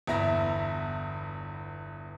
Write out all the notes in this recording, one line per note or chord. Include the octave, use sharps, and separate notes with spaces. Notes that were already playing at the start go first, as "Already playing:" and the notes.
G1 E2 E4 E5 A#5 A#6